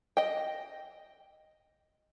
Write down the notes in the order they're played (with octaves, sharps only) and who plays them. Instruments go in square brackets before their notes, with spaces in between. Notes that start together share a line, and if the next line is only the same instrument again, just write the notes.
[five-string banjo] D#5 G5